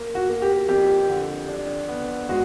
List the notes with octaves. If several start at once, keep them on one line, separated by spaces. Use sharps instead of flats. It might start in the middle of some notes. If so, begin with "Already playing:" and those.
Already playing: A#3
F#4
A#3
G4
F2 G4
D3
D4
B3
G#3 F#4